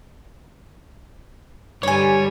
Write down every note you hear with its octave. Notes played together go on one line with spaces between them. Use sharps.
G2 D3 G3 C#5 D5 G#5